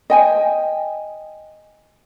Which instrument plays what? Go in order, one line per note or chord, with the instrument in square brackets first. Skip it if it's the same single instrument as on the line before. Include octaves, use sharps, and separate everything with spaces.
[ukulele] D#5 G5 G#5